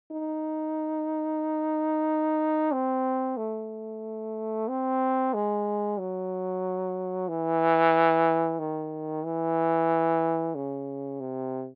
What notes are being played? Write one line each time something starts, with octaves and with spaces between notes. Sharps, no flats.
D#4
C4
A3
C4
G#3
F#3
E3
D#3
E3
C#3
C3